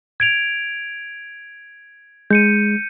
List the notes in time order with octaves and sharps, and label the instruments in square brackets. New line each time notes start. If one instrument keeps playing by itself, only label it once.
[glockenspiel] G#6 D7 F7
[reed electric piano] G#3 [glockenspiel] G6 C#7 D#7